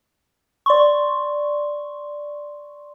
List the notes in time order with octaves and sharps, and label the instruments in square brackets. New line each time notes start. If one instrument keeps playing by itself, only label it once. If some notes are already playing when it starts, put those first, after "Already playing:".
[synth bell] D5 C6 C#6